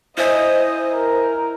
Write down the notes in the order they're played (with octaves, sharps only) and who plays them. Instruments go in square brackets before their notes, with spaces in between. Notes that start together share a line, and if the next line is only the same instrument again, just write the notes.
[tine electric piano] E4 E5 G#5 [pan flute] C5 [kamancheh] D#5
[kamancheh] A#4